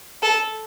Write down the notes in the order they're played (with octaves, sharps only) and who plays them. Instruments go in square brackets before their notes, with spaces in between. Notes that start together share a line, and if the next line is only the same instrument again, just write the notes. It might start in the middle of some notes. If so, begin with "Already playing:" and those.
[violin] A4